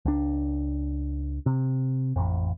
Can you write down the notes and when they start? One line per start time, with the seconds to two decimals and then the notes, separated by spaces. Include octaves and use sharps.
0.05 C#2 D4
1.46 C3
2.16 A1 F2